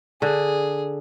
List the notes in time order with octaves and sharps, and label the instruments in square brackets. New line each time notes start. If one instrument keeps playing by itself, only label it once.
[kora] D3 [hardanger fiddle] G#4